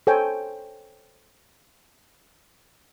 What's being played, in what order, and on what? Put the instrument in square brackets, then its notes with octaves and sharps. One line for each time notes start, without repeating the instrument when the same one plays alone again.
[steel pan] A4 C5 C#5 G5 G#5